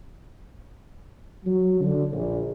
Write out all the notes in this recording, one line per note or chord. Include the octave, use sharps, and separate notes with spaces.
F#3
D3
A#1